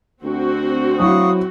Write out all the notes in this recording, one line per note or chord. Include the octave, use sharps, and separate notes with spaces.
D2 C4 F#4
F#3 E4 F5 C#6 D#6